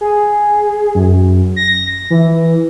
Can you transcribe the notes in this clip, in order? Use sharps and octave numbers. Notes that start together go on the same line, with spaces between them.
G#4
F#2
A#6
E3